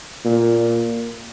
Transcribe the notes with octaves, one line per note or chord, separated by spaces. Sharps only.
A#2